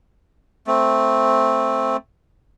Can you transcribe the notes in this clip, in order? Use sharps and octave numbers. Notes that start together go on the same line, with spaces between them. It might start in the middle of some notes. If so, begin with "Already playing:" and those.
A3 C4